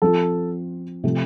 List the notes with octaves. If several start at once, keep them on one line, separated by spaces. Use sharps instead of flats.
F3 C4 F4 A4
C3 F3 A3